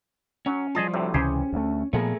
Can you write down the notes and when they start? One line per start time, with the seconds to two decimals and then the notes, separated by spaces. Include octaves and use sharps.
0.46 F#3 C#4
0.75 F3 G3 F4 G#4 D#5 A5
0.94 D2 A2 C3
1.14 C#2 C3 E3 C#4 G4 G#4 C5
1.53 D2 A3
1.93 A#2 F3 A3 B3 G#4 A#4